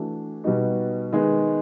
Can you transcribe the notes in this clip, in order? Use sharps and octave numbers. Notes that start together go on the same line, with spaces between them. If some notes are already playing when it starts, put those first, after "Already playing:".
Already playing: E3 A3 D4 F#4
B2 G3 B3 D#4 F#4
D#3 G#3 B3